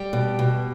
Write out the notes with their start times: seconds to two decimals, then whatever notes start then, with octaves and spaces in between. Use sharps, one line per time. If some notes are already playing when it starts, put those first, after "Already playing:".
Already playing: G3 G4
0.13 B2
0.39 B2